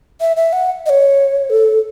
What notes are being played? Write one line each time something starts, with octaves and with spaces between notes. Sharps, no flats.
E5
E5
F#5
D#5
C#5
A4